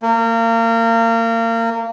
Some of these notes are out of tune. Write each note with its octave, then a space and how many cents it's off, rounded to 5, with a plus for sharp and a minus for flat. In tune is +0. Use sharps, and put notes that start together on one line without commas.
A#3 -30